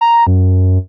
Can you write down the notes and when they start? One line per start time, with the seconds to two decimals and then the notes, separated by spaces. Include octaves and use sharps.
0.01 A#5
0.27 F#2